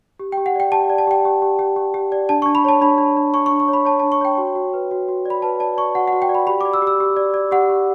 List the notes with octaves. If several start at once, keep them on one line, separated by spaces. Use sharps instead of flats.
G4
G5
G4
F#5
D5 G5
G4 A5
D5
A5
G4 G5
G4
G4
G4
G4
G4
D5
D4 A5
D4 C#6
B5
C#5 A5
D4 B5
D4
D4
D4 C#6
C#6
D4
C#6
C#5
B5
C#5 A5
D4 A5
C#6
C#5 G5
F#4
F#4
B4
F#4
F#4
D5 B5
B4 A5
D5 A5
D5 C#6
F#4 F#5
F#5
F#4
G5
D5
B5
G4 B5
D6
D5
E6
G4
E6
G4
D5
D5
G4 F#5
G4